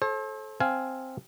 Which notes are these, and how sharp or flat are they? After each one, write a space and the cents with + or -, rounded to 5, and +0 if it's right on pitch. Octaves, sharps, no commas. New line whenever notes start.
A4 -25 C5 +40
C4 +0 F5 +0 G#5 +10